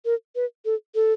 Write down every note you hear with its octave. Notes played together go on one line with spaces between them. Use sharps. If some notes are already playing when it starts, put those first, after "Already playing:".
A#4
B4
A4
A4